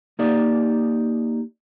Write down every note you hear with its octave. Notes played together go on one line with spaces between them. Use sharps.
A#3 D#4 G4 D5